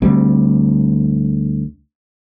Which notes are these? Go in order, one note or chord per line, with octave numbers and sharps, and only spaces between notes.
D2 G3 C4